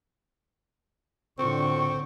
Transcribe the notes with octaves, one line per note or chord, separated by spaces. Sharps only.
A2 D3 C4 F4 C#6